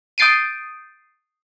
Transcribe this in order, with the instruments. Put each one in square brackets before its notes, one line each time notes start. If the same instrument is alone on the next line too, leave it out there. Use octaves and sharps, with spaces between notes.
[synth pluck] D#6 G6 A6 C7 D7 D#7